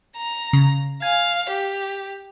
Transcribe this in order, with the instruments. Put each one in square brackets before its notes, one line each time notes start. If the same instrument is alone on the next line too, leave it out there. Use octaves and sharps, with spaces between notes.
[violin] A#5
[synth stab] C#3
[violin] F5 [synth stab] G#5
[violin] G4